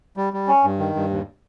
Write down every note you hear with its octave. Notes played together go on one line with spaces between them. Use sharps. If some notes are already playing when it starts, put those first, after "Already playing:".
G3
G3
C#4
G2
D#3
G2
D#2